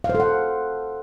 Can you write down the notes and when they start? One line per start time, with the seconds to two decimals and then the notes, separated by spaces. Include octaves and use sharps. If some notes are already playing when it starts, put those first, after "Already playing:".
0.04 F5
0.09 C5
0.15 A4
0.20 F#5